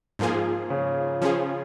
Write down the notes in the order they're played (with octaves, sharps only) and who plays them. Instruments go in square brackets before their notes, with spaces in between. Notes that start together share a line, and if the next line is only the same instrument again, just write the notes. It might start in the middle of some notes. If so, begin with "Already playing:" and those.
[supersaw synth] G#2 F3 A#3 F4 G#4
[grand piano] C#3
[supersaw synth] F3 C#4 F4 G#4